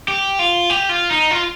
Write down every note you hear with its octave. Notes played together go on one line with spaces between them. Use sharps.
G4
F4
G4
F4
D#4
F4